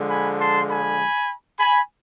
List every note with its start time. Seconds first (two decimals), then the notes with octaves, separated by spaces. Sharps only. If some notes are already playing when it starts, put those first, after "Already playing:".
Already playing: D3 F3 G#3
0.09 G#5 B5
0.39 A5 C6
0.69 G#5 B5
1.59 G#5 B5